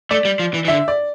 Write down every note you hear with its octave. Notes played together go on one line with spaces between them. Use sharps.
A3 D5
G3
F3
E3
E3
D3 E5
D5